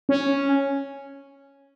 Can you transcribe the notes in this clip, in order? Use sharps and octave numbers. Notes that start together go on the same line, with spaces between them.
C#4